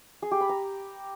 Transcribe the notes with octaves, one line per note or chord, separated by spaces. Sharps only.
G#4
G4
B5
A#5